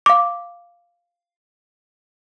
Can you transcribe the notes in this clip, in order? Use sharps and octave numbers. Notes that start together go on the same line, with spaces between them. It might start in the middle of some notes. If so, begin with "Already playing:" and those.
F5 D6